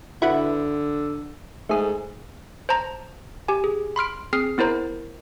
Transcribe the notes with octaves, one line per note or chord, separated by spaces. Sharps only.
D3 E4 F#4 B4
G#2 A3 G#4
C5 A5 A#5
G4 G#5
G#4
B5 C6 F6 D7
C4 G#4 D#6 F6 C7
B3 E4 A#4 C5 A#5